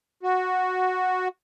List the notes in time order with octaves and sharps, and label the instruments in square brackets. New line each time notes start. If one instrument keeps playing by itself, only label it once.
[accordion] F#4